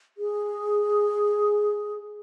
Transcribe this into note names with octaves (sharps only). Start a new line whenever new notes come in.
G#4